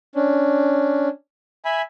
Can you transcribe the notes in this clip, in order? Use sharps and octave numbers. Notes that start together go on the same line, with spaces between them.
C#4 D4
E5 G#5 B5